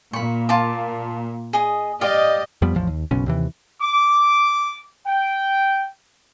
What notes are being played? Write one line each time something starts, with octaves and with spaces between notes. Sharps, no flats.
A#2 B5 C#6
F4 A5 D6
G#4 D#5
G4 D5 D#5 F5
F2 F3 G3 B3
A1 E2 F3
D#2
F#1 B1 B2 C#4
D#2 C3 E3
D6
G5